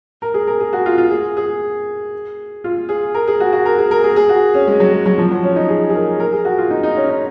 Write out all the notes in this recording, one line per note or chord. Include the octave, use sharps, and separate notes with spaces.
A#4
G#4
A#4
G#4
F#4
F4
F4
G#4
G#4
F4
G#4
A#4
G#4
F#4
F#4
A#4
G#4
A#4
G#4
G#4
F#4
C#4
G#3
F#3
G#3
F#3
F3
F#3
C#4
D#4
G#4
G#4
A#4
A#4
G#4
F#4
F4
D#4
D#4
C#4
D#4